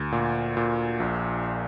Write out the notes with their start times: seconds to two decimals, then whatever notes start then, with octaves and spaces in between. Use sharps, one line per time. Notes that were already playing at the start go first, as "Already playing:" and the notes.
Already playing: D2
0.12 A#2
0.57 A#2
1.00 A#1